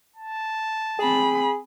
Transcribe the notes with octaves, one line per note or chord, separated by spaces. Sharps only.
A5
C4 G#4 B5